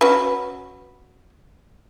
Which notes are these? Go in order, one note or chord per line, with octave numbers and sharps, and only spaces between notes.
C#4 F#4 B4